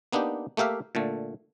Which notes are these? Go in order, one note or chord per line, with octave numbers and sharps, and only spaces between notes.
A#3 B3 D4 D#4 G4
A3 A#3 G4 E5 F5
A#2 D3 A3